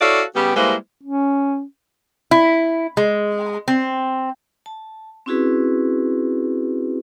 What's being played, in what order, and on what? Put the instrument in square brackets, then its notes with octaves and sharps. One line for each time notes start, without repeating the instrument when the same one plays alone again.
[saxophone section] E4 F#4 A4 C#5 D5 F5
C#3 G3 B3 G4
G3 G#3 A#3 E4 B4 C5
[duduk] C#4
[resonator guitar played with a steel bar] E4
G#3
C4
[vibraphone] A5
C4 C#4 E4 F#4 G#4 B4